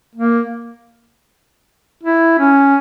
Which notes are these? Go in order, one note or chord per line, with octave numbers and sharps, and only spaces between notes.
A#3
E4
C#4